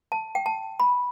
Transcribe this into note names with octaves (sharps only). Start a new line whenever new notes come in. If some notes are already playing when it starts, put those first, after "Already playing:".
A5
G5
A5
B5